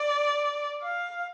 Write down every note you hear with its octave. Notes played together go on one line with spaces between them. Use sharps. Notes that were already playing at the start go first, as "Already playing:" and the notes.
Already playing: D5
F5